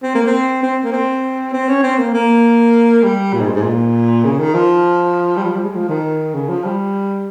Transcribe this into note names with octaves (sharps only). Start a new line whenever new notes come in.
C4
A#3
C4
C4
A#3
C4
C4
C#4
C4
A#3
A#3
G3
A#2
G#2
G2
G#2
A#2
C#3
D#3
F3
G3
F3
G3
G#3
F3
D#3
C#3
F3
G3